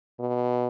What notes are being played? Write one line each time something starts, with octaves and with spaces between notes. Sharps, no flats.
B2